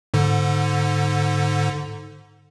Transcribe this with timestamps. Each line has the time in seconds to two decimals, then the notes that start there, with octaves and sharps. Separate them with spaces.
0.14 G#2 D3